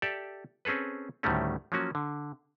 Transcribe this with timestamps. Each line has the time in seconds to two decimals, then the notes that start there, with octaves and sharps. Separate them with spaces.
0.02 G4 A4 D5 E5
0.65 C4 C#4 G#4 A4 B4
1.23 D2 A2 D#3 G3 A3 C#4
1.72 F3 F#3 A#3 C#4 F#4
1.95 D3